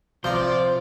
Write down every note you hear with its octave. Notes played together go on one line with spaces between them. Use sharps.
C3 F3 F4 C5 D5 A#5